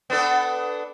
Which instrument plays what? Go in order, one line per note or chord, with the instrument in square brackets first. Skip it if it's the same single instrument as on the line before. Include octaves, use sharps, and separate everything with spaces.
[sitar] B3 D4 A4